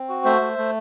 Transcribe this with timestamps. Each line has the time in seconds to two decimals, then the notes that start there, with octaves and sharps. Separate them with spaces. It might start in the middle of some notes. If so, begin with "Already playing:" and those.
Already playing: C4
0.09 F#4
0.25 A3 C5 E5
0.41 A3
0.58 A3